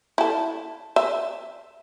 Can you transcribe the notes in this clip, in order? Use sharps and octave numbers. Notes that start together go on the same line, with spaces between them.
E4 A4
E5